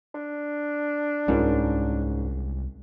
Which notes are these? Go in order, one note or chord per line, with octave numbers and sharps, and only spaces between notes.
D4
C2 G#2 G#3 C#4 F4 A#4